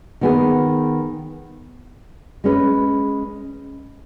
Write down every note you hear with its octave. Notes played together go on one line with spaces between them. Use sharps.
D#3 B3 G#4
G#3 C#4 B4